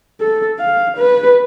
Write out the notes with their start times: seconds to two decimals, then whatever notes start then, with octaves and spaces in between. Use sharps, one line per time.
0.21 A4
0.60 F5
0.97 B4